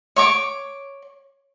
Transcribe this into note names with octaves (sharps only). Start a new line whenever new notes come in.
C#5 C#6 D6